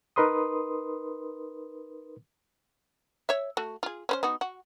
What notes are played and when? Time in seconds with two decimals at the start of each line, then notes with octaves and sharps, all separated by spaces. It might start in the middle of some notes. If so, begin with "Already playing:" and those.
0.16 D#4 A#4 B4 C6 D#6
3.29 C#5 E5
3.57 A3 F#4
3.83 F4 G#4
4.09 C#4 B4 C5
4.23 B3 D#4 F#4
4.41 F#4